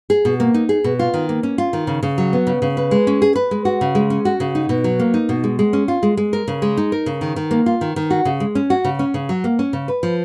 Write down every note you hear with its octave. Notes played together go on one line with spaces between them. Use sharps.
G#4
B2
A#3
D#4
G#4
B2
F4
D#3
A#3
C#4
F4
D#3
C#3
C#3
F#3
B3
C#3
C#3
B4
G#3
C#4
G#4
B4
G#3
F#4
C#3
G#3
C#4
F#4
C#3
D#4
B2
F#3
A#3
D#4
B2
G#3
G#3
C#4
F4
G#3
G#3
A#4
C#3
G#3
D#4
A#4
C#3
D#3
D#3
A#3
F4
D#3
D#3
F#4
C#3
G#3
C#4
F#4
C#3
C#4
C#3
F#3
A#3
C#4
C#3
B4
F3